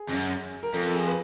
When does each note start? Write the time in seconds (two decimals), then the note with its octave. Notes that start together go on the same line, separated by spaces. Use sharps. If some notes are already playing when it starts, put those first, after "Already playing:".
Already playing: G#4
0.09 F2
0.13 F#2
0.63 A#4
0.74 F2 A4
0.94 G#4
1.07 B4